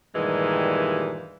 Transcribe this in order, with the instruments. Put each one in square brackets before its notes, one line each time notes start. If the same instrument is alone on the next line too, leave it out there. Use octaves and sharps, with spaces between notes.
[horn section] G2 A#2 D#3 E3 G3 G#3